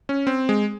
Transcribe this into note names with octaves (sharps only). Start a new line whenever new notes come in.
C#4
C4
G#3